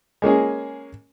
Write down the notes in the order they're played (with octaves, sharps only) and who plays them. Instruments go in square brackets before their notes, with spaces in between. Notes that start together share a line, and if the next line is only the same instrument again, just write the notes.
[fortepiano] G#3 A#3 C#4 G#4